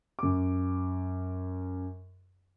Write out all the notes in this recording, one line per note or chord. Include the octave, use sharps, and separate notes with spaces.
F#2 D6